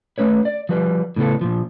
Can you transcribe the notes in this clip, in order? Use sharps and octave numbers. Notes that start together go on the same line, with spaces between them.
A3 C#4 B4 C#5
D5
F3 G3 B4
A2 C#3 B3 A4
A#2 F3